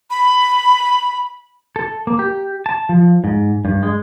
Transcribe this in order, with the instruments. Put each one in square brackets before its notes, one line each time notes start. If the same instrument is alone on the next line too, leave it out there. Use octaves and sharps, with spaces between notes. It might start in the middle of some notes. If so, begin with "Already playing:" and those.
[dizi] B5
[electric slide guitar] A4
A#3
G4
A5
F3
G#2
G2
G#3